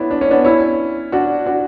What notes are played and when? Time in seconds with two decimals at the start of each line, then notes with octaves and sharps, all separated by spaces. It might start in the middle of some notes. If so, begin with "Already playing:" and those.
Already playing: B3 C#4 D4 E4
0.11 D4
0.21 C#4
0.31 B3 D4
0.44 C#4 E4
1.12 D4 F#4
1.46 D4 F#4